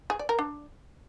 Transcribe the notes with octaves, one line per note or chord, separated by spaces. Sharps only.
G#4
D5
A#4
D4